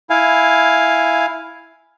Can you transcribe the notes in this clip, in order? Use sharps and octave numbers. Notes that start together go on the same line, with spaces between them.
E4 F5 G#5